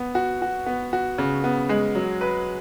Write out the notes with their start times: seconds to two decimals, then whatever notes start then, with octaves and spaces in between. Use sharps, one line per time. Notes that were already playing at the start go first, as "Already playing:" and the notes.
Already playing: B3
0.15 F#4
0.42 F#4
0.66 B3
0.93 F#4
1.18 C#3
1.44 B3
1.69 G#3
1.95 F#3
2.21 B4